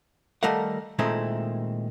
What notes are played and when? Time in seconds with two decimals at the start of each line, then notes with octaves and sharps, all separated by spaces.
0.43 D#3 G3 A3 A#4 F5 F#5
0.99 A#2 D#3 G#3 A3 C4 E4